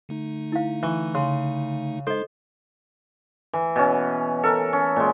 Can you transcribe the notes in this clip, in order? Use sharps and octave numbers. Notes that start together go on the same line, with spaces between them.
D3 A3 D#4
E4 F5
E3 C#6
C#3 C6
G#3 D#4 A4 C5 D#5
E3
B2 C#4
A4 A#4
C#4
A#2 G#3